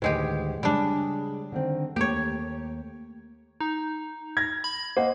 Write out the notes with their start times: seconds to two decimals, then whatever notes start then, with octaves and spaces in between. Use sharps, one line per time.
0.02 D2 A2 D#3 G#3 G4 B4
0.63 C#3 G3 G#3 D4
1.52 D3 D#3 C4
1.96 D#2 A3 A#3 G4 C#5
3.61 D#4
4.37 G#6 A#6
4.64 B5
4.97 A#3 C5 D#5 F#5